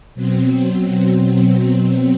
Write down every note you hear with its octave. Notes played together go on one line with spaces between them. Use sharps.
B2 F#3 C4